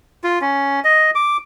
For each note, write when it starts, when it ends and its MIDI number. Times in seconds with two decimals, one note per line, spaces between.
0.24 0.39 65
0.41 0.80 61
0.84 1.11 75
1.15 1.37 86